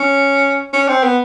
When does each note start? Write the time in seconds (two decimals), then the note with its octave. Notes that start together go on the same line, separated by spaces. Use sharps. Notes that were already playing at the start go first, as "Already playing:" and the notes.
Already playing: C#4
0.73 C#4
0.88 C4
1.03 B3